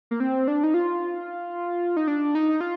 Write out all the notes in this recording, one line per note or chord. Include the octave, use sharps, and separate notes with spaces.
A#3
C4
D4
D#4
F4
D#4
D4
D#4
F4